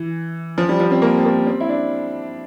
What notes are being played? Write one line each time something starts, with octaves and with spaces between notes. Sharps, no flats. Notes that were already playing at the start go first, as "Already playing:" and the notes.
Already playing: E3
F3
G3
F3
C4
A#3
C4
A#3
C4
E4
D4